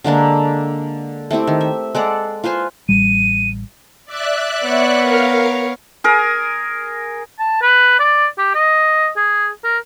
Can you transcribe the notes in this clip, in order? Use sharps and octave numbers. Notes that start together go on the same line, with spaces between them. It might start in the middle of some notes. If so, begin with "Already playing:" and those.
D3 G#3 A#3 D4
A3 C4 E4 G4
D#3
E5
G#3 A4 D5 F#5
F4 B4 C5 G#5
A1 G3 D#7
D5 E5 F#6
B3 C#5
A#4 F5
G#4 A#4
A5
B4
D5
G4
D#5
G#4
A#4